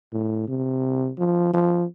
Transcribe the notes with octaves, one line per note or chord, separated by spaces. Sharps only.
A2
C3
F3
F3